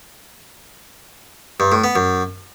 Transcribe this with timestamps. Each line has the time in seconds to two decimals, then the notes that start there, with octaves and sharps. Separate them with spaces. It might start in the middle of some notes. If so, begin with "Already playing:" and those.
1.60 G2
1.72 A2
1.84 B3
1.96 F#2